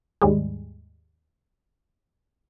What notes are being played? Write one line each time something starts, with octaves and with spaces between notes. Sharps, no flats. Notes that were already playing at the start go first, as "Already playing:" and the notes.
D#2 G#2 G3 G#3